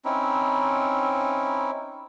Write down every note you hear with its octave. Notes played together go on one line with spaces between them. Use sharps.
C4 C#4 D#4 E4